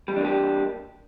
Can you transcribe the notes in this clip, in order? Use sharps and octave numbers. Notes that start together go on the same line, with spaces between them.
E3 G3 A#3 D4 G4